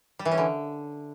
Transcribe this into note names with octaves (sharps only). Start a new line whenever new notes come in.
G3
E3
C#4
D3